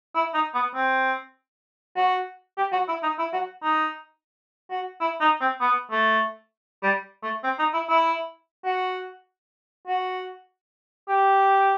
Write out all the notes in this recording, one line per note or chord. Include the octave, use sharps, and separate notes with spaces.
E4
D#4
B3
C4
F#4
G4
F#4
E4
D#4
E4
F#4
D#4
F#4
E4
D#4
C4
B3
A3
G3
A3
C4
D#4
E4
E4
F#4
F#4
G4